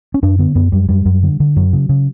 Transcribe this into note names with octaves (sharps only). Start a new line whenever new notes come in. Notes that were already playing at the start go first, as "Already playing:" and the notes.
C#4
F#2 D4
D3 B3
F#2 B3
F#2 G3
F#2 G3
F#2
D3
D3
F#2 F#3
C#3
C#3